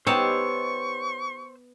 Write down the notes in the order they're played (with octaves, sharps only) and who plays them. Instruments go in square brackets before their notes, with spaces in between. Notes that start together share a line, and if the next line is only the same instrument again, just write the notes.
[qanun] B3 C#5 A5 [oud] D#4 G4 [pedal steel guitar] C5 E6 [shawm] C#6